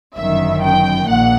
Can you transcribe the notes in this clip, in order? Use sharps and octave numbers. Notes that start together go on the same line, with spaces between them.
G1 F#2 D#3 E5
G5
A#1 A#2 F#5